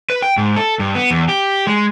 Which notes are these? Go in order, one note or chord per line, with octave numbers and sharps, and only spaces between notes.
B4
G5
G#2
A4
G2
B3
E2
G4
G#3